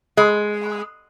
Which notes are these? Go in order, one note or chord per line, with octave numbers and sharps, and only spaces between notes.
G#3